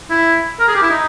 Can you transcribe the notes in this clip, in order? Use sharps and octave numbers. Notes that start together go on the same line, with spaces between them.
E4
A#4
G#4
G4
E4
D#4